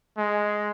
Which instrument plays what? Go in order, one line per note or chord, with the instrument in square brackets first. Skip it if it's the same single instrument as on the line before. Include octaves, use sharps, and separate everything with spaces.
[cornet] G#3